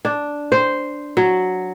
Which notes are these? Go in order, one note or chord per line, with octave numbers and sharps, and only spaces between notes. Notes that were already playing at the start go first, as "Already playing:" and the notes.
D4
C5
F#3